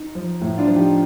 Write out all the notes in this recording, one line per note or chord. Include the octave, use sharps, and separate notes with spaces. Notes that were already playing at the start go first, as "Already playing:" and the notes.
Already playing: D#4
F3
A2
D4 F4
F3
D#4 G4